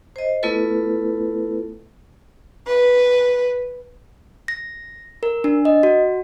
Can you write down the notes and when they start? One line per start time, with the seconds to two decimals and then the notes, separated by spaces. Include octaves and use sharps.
0.16 C5 D#5
0.43 A3 B3 E4 F4 A4 B4
2.66 B4
4.48 A#6
5.23 A#4
5.44 D4
5.65 D#5
5.83 F#4